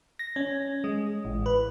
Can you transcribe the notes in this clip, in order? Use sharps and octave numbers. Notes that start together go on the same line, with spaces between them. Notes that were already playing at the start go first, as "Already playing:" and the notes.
A#6
C#4
G#3
A1
B4